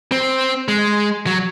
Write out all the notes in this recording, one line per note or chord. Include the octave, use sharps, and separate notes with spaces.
C4
G#3
F#3